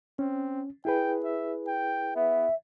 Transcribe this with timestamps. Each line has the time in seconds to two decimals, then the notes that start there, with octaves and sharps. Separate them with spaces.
0.19 C4 C#4
0.85 E4 G#4 B4 G5
1.24 E5
1.67 G5
2.16 B3 E5